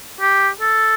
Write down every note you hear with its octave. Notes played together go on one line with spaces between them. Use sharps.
G4
A4